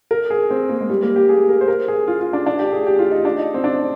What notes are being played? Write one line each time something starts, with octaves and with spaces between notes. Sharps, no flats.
A#4
G#4
C4
A#3
G#3
G3
A#3
G4
G#4
A#4
C5
A#4
G#4
F4
F4
D4
D4
G4
G#4
G4
F4
D#4
D4
D#4
C4
D4